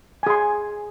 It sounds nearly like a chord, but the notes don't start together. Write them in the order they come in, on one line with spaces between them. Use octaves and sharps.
G#5 G#4 C6